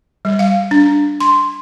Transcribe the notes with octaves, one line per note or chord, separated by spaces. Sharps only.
G3
F5
D4
C6